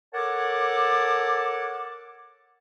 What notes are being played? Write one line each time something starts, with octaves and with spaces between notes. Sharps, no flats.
A4 A#4 C#5 F#5 A5 D6